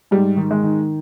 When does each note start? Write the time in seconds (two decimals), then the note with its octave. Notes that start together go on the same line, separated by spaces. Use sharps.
0.11 G#2 G3
0.37 D#3
0.51 G#3
0.63 D#3